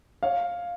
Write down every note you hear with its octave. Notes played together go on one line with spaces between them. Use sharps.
C#5 F5